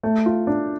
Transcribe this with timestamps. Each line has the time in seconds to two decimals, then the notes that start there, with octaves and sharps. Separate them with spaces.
0.03 A3
0.26 F4
0.47 D4